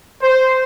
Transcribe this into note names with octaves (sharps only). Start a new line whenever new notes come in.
C5